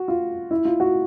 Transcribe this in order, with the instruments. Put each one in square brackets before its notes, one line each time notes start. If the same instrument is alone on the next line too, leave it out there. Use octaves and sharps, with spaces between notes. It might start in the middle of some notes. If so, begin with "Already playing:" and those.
Already playing: [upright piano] F#4
F4
E4
F4
F#4